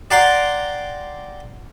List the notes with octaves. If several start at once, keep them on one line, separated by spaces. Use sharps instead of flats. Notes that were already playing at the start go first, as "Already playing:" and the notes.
D5 F#5 G5 A#5 C6 D6